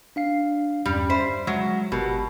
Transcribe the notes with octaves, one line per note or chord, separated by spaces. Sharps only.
D4 F5 C7
E2 G2 G3 C#4
C5 E5 B6 C7
F#3 G#3
G1 B2 G4 A#4